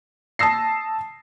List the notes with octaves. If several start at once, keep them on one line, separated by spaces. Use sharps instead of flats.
A5 D#6 E6 A#6 C7